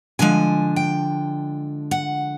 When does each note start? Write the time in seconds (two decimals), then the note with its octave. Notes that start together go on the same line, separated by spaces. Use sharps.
0.19 D3 F3 G#3 G#5
0.76 G5
1.91 F#5